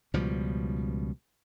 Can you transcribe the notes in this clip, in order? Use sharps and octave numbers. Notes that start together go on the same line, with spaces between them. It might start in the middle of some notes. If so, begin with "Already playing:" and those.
C#2 B2 F3 G3